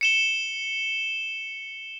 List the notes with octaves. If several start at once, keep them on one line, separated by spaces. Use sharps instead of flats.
C#7 E7 G7